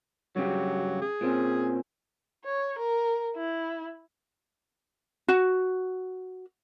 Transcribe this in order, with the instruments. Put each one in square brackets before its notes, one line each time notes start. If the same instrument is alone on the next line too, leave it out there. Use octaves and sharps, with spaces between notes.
[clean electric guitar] G2 C#3 G4 [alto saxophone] F#3
[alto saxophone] G#4
[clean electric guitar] A#2 C4 C#4
[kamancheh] C#5
A#4
E4
[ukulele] F#4